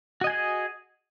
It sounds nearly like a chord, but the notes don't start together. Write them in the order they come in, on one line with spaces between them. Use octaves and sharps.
F#4 D#5 G#5 G#4